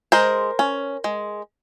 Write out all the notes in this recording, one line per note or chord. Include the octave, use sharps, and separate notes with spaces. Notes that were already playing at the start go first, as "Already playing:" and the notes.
G#3 A#4 C5
C#4
G#3